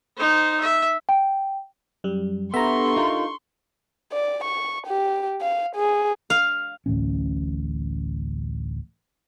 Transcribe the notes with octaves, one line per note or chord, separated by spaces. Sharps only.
D#4 C5
E5
G5
F#2 G3
B3 D4 G4 A4 E5 A#5 C6 C#6
D#4 F4 A#4
D5
C#6
G4
F5
G#4
F5
D1 A1 C#4